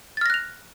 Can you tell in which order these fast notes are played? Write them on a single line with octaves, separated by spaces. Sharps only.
A6 F6 A#6 F#6 F7